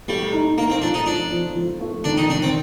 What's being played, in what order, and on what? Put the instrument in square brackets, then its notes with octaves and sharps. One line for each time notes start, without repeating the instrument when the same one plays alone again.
[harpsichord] G3 [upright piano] A3
[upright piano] D#4
[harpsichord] A#3 [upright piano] D#4
[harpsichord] C4
[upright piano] F3 [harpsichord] D4
[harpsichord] D#4
[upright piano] F3 [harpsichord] D4
[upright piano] F3
F3
A3
[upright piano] D#3 [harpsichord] D4
[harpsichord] D#4
[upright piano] D#3 [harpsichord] D4
[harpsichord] C4